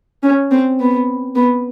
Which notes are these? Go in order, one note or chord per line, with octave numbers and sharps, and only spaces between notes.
C#4
C4
B3
B3